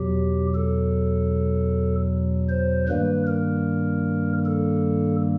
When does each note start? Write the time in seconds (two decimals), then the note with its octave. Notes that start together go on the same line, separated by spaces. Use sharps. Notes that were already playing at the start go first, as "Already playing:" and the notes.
Already playing: E2 B2 F#3 G4
0.54 A4
2.49 C5
2.88 G2 D#3 G3 A#3 B4
3.27 A#4
4.45 A4